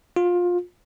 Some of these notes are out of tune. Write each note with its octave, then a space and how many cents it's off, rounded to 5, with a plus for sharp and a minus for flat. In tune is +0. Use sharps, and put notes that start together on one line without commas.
F4 +20